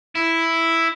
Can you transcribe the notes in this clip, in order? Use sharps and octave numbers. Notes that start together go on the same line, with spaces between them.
E4